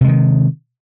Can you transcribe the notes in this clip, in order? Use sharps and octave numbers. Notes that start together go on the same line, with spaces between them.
C3 D#3 G#3